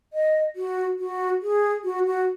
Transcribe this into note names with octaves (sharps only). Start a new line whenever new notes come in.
D#5
F#4
F#4
G#4
F#4
F#4